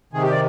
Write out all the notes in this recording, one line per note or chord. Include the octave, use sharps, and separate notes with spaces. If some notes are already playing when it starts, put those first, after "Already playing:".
C3 D#3 G#4
G4
D5